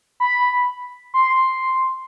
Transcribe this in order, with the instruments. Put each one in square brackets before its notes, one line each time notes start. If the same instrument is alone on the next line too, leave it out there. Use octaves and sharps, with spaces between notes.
[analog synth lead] B5
C6